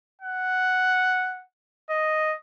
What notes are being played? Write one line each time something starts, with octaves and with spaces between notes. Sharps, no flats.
F#5
D#5